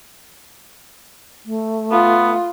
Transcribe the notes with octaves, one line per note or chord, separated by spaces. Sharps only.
A3
B3 F4